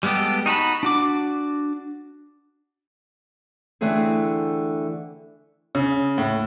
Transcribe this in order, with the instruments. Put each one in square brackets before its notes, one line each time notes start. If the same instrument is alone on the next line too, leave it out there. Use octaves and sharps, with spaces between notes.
[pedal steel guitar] G3 G#3 B3 G4 A4
D#4 F#4 A5 B5
D4 F#4 D6
[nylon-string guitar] D3 E3 A3 C4 G#4 A4
[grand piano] C#3
A2